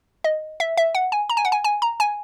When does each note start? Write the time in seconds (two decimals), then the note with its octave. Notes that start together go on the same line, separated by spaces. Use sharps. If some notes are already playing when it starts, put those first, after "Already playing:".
0.24 D#5
0.60 E5
0.78 E5
0.95 F#5
1.12 G#5
1.29 A#5
1.37 G#5
1.45 F#5
1.52 G#5
1.64 G#5
1.82 A#5
2.00 G#5